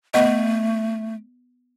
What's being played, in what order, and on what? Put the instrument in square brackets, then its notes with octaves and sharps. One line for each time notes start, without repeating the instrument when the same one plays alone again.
[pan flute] A3 [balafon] B3 D#5